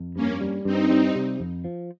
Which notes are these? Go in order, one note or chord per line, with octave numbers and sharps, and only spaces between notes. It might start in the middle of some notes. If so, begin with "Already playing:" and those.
Already playing: F2
G2 A#3 C#4
G3
G2 C4 D#4
G3
C3
F2
F3